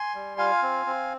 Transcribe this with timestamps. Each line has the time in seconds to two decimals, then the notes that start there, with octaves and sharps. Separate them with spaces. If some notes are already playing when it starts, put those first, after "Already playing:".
Already playing: G#5 C6
0.15 G3
0.38 F4 F5 G#5
0.62 C4
0.86 C4